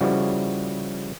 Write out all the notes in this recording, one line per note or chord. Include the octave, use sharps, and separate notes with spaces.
C#3 F3 G3 E4 F#4